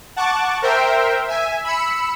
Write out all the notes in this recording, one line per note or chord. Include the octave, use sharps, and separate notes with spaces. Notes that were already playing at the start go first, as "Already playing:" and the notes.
F#5 A5 C#6 D6
A#4 C5 E5 G5
E5 G#5
B5 E6 C#7